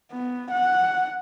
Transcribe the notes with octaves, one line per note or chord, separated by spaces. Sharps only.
B3
F#5